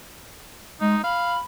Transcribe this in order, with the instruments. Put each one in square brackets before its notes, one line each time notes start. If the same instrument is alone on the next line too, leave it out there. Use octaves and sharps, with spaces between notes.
[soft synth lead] G#3 [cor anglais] D#4
[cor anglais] F5 [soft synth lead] B5